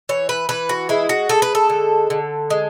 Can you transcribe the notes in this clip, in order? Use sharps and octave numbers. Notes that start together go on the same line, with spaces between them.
E3 C#5
B4
E3 B4
F#4
G#3 E4
F#4
G#3 A4
B4
A4
D3
D3
G#3